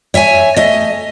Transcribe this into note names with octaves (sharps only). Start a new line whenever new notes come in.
C#5 E5 F#5 G#5
A3 D#5